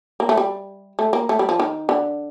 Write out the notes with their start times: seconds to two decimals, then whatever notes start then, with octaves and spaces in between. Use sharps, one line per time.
0.20 A#3
0.29 A3
0.37 G3
0.99 A3
1.13 A#3
1.29 A3
1.39 G3
1.49 F3
1.60 D#3
1.89 D3